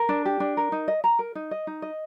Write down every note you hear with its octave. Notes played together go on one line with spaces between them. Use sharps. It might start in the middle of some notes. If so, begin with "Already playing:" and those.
Already playing: A#4
D4
G4
D4
A#4
D#4
D#5
A#5
A#4
D#4
D#5
D#4
D#5